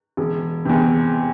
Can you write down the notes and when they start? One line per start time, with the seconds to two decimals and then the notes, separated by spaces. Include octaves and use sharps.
0.17 E1
0.65 E2 C3